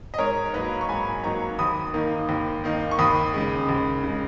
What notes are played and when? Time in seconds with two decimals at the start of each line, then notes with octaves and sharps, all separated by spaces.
0.14 D#5
0.18 G#2 A#4 C#5
0.53 F#3 A#3 D#4 B4 D#5
0.81 C#6
0.89 G#2 G#5 B5
1.24 F#3 A#3 D#4 A#5 C#6
1.59 D#2 B5 D#6
1.94 D#3 A#3 D#4
2.29 D#2
2.64 D#3 A#3 D#4
2.91 C#6
2.99 D#2 B5 D#6
3.34 C#3 G#3
3.69 D#2
4.04 C#3 G#3